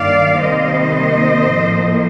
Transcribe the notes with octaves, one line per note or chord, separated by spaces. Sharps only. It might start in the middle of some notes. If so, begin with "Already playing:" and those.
Already playing: G2 D#3 G3 A#3 D5 F5
C3 D#3 G3 A#3 C5 D#5
A2 F3 A#3